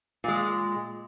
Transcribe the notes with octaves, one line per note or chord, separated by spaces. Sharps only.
A#2 G#3